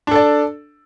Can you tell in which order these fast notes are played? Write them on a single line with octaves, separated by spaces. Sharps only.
D4 A4 D5